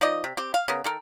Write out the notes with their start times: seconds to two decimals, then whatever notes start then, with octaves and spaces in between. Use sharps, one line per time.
0.01 F3 D#4 D5 D#5
0.24 C3
0.37 C4 G4
0.54 F5
0.68 C#3 B3 A#4
0.84 D#3 A4 A#4